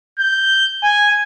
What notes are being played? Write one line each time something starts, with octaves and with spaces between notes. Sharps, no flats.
G6
G#5